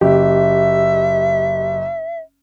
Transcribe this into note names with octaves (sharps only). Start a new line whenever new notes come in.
F#1 G4 E5